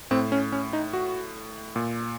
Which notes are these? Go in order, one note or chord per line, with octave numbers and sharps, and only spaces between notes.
A2 C4
C#4
C#4
D#4
F#4
A#2